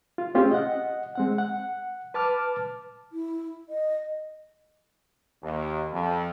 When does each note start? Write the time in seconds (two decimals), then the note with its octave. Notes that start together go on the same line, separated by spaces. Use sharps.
0.18 F4
0.35 A3 C4 C#4 F4 G4 G#4
0.51 D#5 F#5
1.15 G#3 C4 F#5
1.38 F#5
2.14 B4 A5 D6 F6
3.12 E4
3.69 D#5
5.42 D#2
5.92 F2